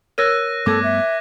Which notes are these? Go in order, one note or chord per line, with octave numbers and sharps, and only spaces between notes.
A#4 C#5 E6 F#6 A#6 D#7
G2 A3 B3 A4 D6 G#6
E5